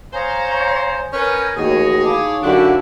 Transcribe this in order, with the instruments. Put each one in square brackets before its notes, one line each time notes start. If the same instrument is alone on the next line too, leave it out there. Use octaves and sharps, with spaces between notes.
[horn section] C5 [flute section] C#5 F5 A#5 [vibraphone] G#5 D#6
[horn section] C#4 B4 [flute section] A#4 G6 G#6
[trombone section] A1 D#2 F#4 [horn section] G#4 C#5 [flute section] D#5
[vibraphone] D#4 F5 A5 [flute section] E4 D6
[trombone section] F#2 D3 F#4 [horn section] D4 E4 [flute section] G4 C#6